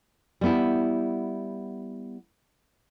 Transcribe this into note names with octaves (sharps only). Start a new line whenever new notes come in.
G3 B3 E4